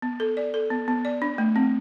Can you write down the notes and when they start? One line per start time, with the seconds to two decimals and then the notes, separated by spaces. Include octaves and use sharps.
0.02 B3
0.20 A4
0.37 D5
0.54 A4
0.71 B3
0.88 B3
1.05 D5
1.22 D4
1.38 A3
1.56 C4